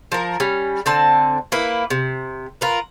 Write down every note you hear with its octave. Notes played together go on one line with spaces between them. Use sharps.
F3 A#4
G3 C#4
D3 C4 A5
A#3 E4 B4
C3
F4 A#4 B4